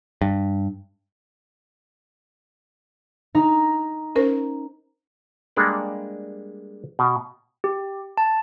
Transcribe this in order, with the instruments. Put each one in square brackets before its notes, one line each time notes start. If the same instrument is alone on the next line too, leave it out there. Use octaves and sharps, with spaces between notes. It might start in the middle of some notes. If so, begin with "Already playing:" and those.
[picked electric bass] G2
[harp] D#4 A#5
[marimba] C#4 A#4 C5
[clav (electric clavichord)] G3 G#3 A#3 D4 A4 D5
B2
[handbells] G4
A5